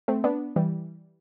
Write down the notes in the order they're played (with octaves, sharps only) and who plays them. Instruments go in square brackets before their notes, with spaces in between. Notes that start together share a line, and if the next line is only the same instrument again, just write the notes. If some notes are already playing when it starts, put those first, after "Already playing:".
[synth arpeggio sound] A3 C4
B3 D4
E3 G3